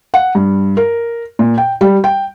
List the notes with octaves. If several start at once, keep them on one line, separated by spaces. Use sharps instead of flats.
F#5
G2
A#4
A#2
G5
G3
G5